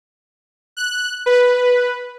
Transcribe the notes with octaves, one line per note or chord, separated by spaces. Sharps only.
F#6
B4